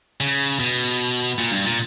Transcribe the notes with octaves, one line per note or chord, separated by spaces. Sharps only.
C#3
B2
A#2
G2
A#2